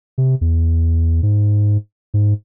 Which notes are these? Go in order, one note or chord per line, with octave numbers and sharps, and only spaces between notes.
C3
E2
G#2
G#2